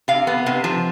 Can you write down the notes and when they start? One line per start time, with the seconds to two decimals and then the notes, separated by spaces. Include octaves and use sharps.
0.08 C3 F5
0.27 B3
0.46 C3
0.64 F3